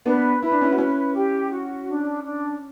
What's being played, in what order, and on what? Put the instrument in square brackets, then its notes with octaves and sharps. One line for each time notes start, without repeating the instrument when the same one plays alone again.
[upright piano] B3 D4 [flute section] B4
[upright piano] E4 [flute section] B4
[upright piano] D4
C#4 E4
F#4
[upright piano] C#4 E4 [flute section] B4
[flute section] G4
F#4
D4
D4